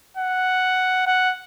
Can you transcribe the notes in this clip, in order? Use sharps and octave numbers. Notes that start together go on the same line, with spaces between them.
F#5
F#5